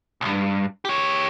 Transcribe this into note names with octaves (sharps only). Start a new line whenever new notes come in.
B1 G2
G4 C#5